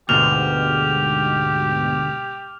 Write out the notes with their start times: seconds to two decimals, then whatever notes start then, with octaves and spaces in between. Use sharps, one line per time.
0.09 D2 G#2 B2 G4 D6 F6 F7